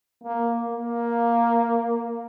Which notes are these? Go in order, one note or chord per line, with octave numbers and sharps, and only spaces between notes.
A#3
A#3